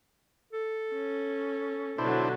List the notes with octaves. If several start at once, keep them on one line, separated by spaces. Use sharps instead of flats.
A4
C#4
B2 D3 F#3 D4 E4 C5